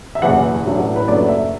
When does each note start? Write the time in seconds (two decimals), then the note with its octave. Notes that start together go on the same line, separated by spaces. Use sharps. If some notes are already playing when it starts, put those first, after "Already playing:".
0.15 E5
0.22 F#1 E2 B2 F#5
0.65 A1 A2 F#3 B3 D4
0.96 B4
1.08 F#1 F#2 F#3 A3 D4 D5
1.29 E5